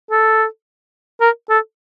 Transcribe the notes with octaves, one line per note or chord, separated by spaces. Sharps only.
A4
A#4
A4